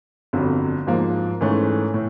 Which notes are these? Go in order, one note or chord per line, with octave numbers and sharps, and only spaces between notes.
G1 F2 D3 F#3
G#2 F3 A#3
G#2 E3 A3 C#4
A2